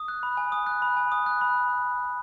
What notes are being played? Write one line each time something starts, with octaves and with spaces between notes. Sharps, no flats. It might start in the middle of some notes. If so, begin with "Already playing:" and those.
Already playing: D#6
F#6
B5
G#5
D#6
F#6
B5
G#5
D#6
F#6
B5